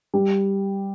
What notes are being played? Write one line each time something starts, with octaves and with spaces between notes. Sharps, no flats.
G3